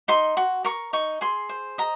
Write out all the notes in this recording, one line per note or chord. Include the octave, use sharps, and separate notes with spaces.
D#4 C6
F#4
A#4 C#6
D#4 C#6
G#4 C6
C5
D#5 A#5